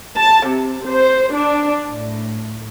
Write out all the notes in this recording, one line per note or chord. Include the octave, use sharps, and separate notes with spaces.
A5
C3
C5
D4
A2